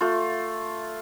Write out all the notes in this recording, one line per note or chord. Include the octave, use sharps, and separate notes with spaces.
A3 F4